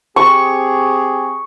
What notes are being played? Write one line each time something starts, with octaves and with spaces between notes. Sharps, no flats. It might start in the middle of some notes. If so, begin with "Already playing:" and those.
C4 G4 G#4 C#6